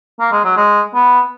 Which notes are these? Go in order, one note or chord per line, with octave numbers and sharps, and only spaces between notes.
A#3
G#3
F#3
G#3
B3